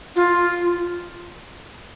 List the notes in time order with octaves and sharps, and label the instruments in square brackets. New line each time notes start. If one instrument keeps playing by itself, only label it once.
[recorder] F4